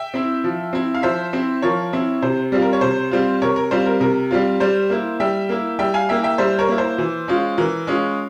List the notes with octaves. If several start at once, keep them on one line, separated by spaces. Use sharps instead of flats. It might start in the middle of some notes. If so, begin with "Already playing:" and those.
Already playing: E5 G5
C4 E4
F3
C4 E4
F5
F3 C5 E5
C4 E4
F3 A#4 C#5
C4 E4
C3 C5
G3 C4 F4
A#4
C#5
C3 C5
G3 C4 F4
C3 A#4 C#5
A#4
G3 C4 F4 C5
A#4
C3 A#4
G3 C4 F4
G3 C5
A#3 E4
G3 E5 G5
A#3 E4
G3 E5 G5
F5 G#5
A#3 E4 E5 G5
E5 G5
G3 C5 E5
A#4 C#5
A#3 E4
C5
E3
G#3 C#4 F4
E3 A#4
G#3 C#4 F4